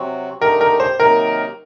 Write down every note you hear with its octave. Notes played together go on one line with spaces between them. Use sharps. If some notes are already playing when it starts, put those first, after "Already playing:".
Already playing: C3 F#3 C4 F#4
D3 A3 D#4 G4 A#4
A#4
C5
C3 D#3 F#3 A#3 D#4 A#4